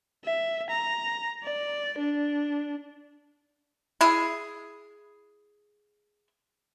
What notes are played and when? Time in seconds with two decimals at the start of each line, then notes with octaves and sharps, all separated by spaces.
0.25 E5
0.69 A#5
1.43 D5
1.98 D4
4.01 E4 G#4